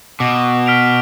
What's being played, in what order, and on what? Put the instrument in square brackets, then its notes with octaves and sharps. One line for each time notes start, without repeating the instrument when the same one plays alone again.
[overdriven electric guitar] B2 [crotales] D6
[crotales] F6 B6 D7 F7